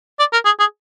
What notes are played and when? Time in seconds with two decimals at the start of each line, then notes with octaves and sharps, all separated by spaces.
0.19 D5
0.33 A#4
0.45 G#4
0.60 G#4